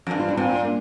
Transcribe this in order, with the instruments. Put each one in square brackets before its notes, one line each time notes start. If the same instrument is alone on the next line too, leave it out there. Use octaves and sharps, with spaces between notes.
[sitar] F2
G2
[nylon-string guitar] F4
D4
[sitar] A#2 [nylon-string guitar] C4 F4
[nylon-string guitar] F4
A#3 D4